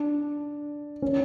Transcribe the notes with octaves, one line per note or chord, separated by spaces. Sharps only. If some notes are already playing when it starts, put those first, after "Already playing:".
Already playing: D4
C#4